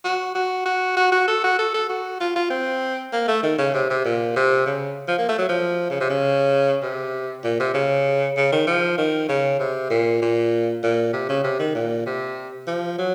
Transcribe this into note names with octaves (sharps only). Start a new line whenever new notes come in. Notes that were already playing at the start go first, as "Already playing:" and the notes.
F#4
F#4
F#4
F#4
F#4
A4
F#4
A4
A4
F#4
F4
F4
C4
A#3
A3
D#3
C#3
C3
C3
A#2
C3
C#3
F3
A#3
A3
F#3
F3
C#3
C3
C#3
C3
A#2
C3
C#3
C#3
D#3
F3
D#3
C#3
C3
A#2
A#2
A#2
C3
C#3
C3
D#3
A#2
C3
F3
F#3